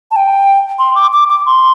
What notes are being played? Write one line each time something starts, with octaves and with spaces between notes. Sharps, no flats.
A5
G5
C6
D6
D6
D6
C6